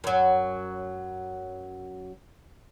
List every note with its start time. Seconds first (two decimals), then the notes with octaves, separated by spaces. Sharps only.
0.04 F#2 F#3